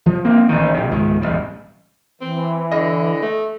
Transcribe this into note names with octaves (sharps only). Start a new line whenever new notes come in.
F3
A#3 C4
A1 D#3
A#1 C3
C#2 G#2 D#3
E1 A1 D#2 G3
E3 C4
D3 D#5
A3